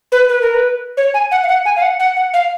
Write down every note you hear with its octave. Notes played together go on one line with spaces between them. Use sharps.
B4
B4
A#4
B4
C#5
G#5
F#5
F5
F#5
G#5
F5
F#5
F#5
F#5
F5